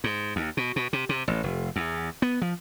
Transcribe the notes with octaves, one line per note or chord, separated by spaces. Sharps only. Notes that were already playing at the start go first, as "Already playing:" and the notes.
G#2
D#2
B2
B2
C3
C3
A1
F1
E2
B3
F3